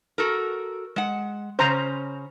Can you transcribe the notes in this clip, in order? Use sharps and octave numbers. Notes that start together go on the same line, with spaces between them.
F#4 A4 A#4
G#3 F#5
C#3 C#4 C5 A#5